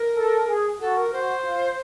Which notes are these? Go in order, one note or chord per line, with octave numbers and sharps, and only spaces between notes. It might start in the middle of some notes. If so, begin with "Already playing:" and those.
Already playing: A#4
A4
G#4
F#4 A4
A#4
F#4 C5
F4